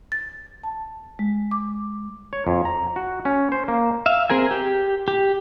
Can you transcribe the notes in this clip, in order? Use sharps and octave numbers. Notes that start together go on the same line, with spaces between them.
A6
A5
G#3
D6
C#5
F2
A#5
F#4
C#4
C5
A#3
E5 F5
C4 G#4 A#4 G#5
G4
G4